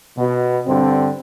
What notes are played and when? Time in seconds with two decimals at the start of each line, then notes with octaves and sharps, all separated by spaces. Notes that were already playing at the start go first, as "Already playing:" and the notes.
0.18 B2
0.67 G2 D3 C4